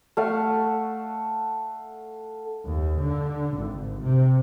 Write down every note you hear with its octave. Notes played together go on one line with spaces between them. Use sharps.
A3 F5 F#5
D#2
D3
G#1
C3